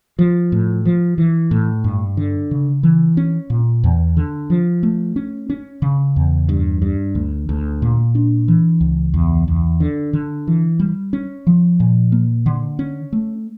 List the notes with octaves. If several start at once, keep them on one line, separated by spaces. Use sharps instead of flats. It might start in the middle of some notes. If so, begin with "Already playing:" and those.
F3
A2
F3
E3
A2
G2
D3
C#3
E3
C#4
A#2
E2
D3
F3
A3
C#4
C#4
C#3
E2
G2
G2
D2
D2
A#2
D4
E3
C#2
E2
E2
D3
D3
E3
G3
C#4
F3
A#2
A#3
D3
C#4
A3